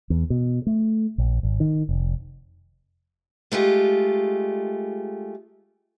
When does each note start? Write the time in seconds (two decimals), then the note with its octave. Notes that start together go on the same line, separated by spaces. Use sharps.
0.10 E2
0.30 B2
0.67 A3
1.18 A#1
1.43 G#1
1.60 D#3
1.89 F1
3.52 G#3 A3 F4 G4